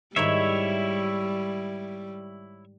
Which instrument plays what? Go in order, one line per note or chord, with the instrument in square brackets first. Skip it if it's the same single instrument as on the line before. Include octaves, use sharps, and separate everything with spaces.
[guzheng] G#2 D#3 [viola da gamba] G3 [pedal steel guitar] E4 C#5 E5